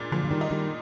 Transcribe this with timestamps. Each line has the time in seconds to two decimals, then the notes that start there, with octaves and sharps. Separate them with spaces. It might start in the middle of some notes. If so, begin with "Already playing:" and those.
Already playing: A#2 G#3
0.12 A#2 D3 F3
0.24 F3
0.31 D#3 G3
0.41 D#4
0.51 D#3 G3